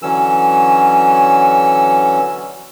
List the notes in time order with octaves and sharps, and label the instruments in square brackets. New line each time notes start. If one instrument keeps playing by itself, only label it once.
[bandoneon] D3 E3 F#3 C#4 E6